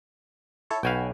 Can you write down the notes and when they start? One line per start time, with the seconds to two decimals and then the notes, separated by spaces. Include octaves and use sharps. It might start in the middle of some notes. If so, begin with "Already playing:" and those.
0.71 E4 A4 C#5
0.83 B1 F#4 F5 G5 G#5 B5